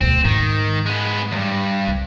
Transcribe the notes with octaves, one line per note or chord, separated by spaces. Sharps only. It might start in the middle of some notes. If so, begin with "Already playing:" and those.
D2 B2 C4
G#2 D#3
G#3 B3
E2 G2
C2